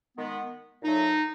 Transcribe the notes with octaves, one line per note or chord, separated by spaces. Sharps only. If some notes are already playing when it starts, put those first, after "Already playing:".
D#3 G#3 B3
A#2 F#3 A3 D#4